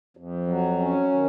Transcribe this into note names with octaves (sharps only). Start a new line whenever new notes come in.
F2
F#3
C#4
D#3